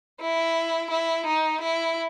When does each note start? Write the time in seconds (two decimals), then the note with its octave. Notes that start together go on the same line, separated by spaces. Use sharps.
0.22 E4
0.91 E4
1.27 D#4
1.62 E4